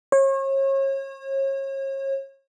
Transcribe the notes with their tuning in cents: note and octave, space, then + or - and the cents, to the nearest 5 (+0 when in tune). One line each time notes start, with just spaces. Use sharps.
C#5 -35